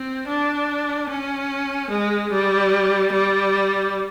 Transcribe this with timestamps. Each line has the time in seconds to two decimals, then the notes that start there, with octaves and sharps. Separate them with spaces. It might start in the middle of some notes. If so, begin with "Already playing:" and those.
Already playing: C4
0.28 D4
1.09 C#4
1.90 G#3
2.31 G3
3.12 G3